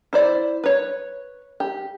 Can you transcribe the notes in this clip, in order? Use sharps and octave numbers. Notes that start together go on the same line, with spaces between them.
E4 C5 D5
B4 C#5
G4